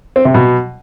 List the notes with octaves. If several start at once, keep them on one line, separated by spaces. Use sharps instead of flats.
C4
C3
B2